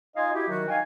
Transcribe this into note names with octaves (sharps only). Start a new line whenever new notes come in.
D#4 F4 D#5 F5 G#5 C6
E4 F#4 G4
D#3 F#3 F#4
D#4 F5 G5 G#5